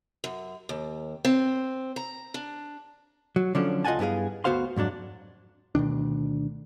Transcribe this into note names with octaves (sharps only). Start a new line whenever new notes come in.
F#2
D#2
C4
A#5
D4
F#3
D3 F3 F#3 C#4 D4
C#2 F4 D#5 F#5 G#5 A5
G2 B3 E4 G#4 F5
D2 B3 F#4 C5 F5 C6
F2 G#2 F#3 D4
D2 B2 D#3 D4